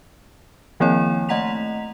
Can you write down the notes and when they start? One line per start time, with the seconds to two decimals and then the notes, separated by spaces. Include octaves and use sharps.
0.80 D#3 F3 A#3 C4 E4 C#5
1.29 A3 D#5 F#5 A#5 B6 F7